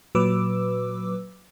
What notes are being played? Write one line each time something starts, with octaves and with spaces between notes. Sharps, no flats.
A#2 F#3 B4 D6 E6